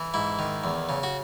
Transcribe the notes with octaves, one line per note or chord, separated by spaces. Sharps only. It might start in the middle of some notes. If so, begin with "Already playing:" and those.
Already playing: E3
G#2 E4
D#3
E2
C#3
F#4